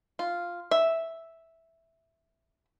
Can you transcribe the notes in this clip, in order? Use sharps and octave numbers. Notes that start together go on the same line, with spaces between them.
F4
E5